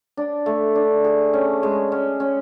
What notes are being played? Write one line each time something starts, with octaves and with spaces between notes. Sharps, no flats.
D4
A3
D4
G#4
C#4
G#3
C#4
C#4